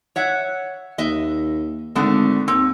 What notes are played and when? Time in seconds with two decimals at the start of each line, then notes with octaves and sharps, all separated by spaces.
0.16 C#5 E5 F#5
0.98 D#2 D#5 E5
1.95 G#1 D3 A3 B3
2.48 D#2 C4